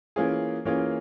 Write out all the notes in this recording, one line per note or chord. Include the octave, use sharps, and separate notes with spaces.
E3 A#3 C#4 F4 G#4
E3 A#3 C#4 F4 G#4